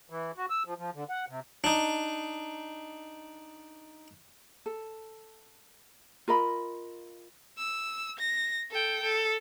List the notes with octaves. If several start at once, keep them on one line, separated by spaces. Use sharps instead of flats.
E3
F#4
E6
F3
F3
D3
F#5
C3
D4 D#4
A4
F4 A#4 D#5 B5
E6
A#6
A4 G5
A4